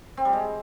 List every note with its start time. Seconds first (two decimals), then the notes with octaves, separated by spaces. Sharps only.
0.17 C4
0.25 G3
0.33 G#3